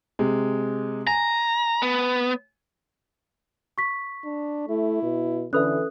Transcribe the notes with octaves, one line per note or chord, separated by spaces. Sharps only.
C3 G#3
G#5 A#5
B3
C#6 B6
D4
A3 E4
B2
D3 E3 C#4 A4 B4 E5 D#6 F#6